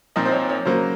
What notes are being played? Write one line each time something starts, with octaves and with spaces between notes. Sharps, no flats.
A#2 F3 C4 D#4 D#5
C5
C#5
C#5
C#3 F#3 A#3 C5